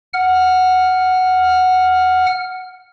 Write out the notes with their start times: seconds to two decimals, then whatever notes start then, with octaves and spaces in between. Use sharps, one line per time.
0.14 F#5 F6